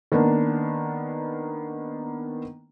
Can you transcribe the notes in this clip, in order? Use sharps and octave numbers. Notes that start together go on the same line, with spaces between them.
D#3 A#3 B3 D4